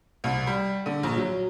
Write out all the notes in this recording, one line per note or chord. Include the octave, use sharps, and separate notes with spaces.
C2
G3
D3
A#1
F#3